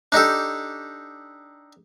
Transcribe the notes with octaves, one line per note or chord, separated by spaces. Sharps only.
D4 D#4 G4 A4